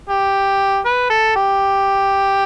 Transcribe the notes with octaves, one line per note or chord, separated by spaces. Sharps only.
G4
B4
A4
G4